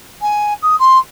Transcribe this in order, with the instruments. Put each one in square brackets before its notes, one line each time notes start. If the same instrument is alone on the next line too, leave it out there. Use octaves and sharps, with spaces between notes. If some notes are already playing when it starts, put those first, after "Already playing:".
[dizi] G#5
D#6
C6